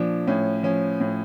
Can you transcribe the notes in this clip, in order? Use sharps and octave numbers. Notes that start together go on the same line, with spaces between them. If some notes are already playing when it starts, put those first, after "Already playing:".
Already playing: A#2 F3 D4
A2 C#4
F3 C#4
A2